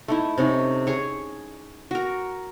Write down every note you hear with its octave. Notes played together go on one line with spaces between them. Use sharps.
A3 D#4 E4
C3 C#4 D#4
G#4 C#5
F#4 A#4